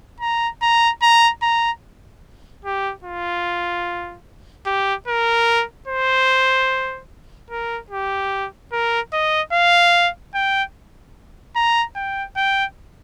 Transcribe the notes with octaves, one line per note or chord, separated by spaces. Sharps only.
A#5
A#5
A#5
A#5
G4
F4
G4
A#4
C5
A#4
G4
A#4
D#5
F5
G5
A#5
G5
G5